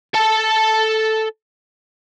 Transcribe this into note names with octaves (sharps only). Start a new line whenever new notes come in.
A4 A5